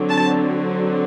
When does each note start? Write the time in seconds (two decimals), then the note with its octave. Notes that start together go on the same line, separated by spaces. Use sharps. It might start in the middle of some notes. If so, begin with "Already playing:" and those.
Already playing: D3 F#3 C4
0.09 A5